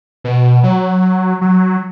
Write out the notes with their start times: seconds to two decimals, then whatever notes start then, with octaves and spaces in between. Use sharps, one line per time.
0.24 B2
0.63 F#3
1.41 F#3